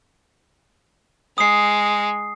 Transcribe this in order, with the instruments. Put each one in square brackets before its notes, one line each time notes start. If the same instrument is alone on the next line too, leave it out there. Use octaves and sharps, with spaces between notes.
[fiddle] G#3 [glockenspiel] D#6 C7